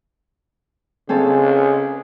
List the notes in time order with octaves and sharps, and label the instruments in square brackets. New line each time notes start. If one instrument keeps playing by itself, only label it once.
[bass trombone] C#3 [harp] C4 C#4 A4